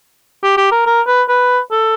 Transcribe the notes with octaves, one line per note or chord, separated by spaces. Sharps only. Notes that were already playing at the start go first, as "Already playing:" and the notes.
G4
G4
A#4
A#4
B4
B4
A4